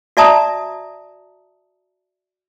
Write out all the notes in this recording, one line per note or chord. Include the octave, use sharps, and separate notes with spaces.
F#4 D5 E5 A5 A#5 D#6